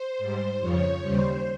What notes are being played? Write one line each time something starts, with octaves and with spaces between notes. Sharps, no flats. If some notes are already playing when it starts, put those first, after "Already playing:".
Already playing: C5
G#2 G3
F2 C#3 F3 C#5
D#2 C#3 G3 C5